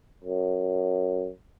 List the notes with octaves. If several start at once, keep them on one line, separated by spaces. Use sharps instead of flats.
F#2